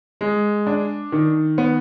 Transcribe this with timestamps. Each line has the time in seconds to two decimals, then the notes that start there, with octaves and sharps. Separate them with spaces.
0.21 G#3
0.67 D4
1.12 D#3
1.58 B3